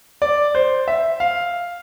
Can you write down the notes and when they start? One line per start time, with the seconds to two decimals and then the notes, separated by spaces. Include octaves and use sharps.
0.22 D5
0.55 C5
0.88 E5
1.20 F5